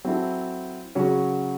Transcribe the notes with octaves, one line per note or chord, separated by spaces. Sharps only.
F#3 C4 E4 A4
C#3 F#3 C#4 F#4